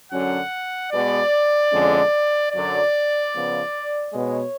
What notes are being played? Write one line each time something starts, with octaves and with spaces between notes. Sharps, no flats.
F#2 D3 F#3 C#4 F#5
B2 G#3 B3 D5
F2 D3 G#3 C#4
F#2 D3 F#3 D5
C#3 F3 B3
B2 G#3 B3 C#5